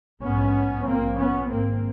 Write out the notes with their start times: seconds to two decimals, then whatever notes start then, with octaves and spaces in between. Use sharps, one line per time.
0.22 A#1 G#2 B3 C#4
0.86 A#1 A#2 A#3 C4
1.17 B3 C#4
1.49 G#1 G#2 A#3 C4